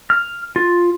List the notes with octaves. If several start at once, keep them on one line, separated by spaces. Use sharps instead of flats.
F6
F4